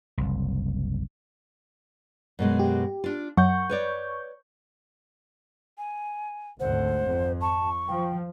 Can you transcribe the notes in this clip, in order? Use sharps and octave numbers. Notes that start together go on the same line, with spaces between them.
F#1 C2
F#2 B2 G#3
G4
D4 F4
F#2 F#5 C#6 G6
B4 C#5 D5
G#5
G#1 D2 C5 F#5
F2
A5 C#6
F3 G5